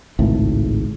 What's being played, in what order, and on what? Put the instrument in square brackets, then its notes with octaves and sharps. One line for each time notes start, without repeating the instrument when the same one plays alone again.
[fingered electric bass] G#1 C#2 A2